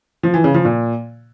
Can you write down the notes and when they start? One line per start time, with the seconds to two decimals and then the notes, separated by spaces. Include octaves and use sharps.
0.23 F3
0.34 E3
0.44 C#3
0.54 F3
0.65 A#2